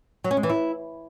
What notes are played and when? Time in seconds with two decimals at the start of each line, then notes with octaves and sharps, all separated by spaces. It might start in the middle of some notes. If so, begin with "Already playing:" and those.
0.24 F#3
0.31 C#4
0.37 G#3
0.43 E3
0.50 E4